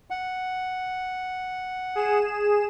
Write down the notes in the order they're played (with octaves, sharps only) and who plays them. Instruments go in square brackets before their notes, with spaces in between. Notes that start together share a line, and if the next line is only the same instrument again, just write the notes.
[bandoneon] F#5
[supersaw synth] G#4 E7